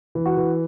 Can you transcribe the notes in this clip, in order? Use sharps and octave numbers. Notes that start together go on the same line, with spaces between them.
E3
F#4
E3